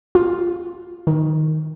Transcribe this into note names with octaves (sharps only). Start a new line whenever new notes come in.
F4
D#3